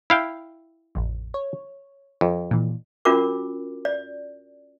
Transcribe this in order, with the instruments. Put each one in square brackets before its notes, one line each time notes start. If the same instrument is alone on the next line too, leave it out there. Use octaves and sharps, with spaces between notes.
[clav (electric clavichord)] E4 F5 G5
[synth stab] A1 F2
C#5
[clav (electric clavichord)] F2
[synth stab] A#2 E3
[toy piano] C#4 D4 F4 F#4 A#4 D6
D5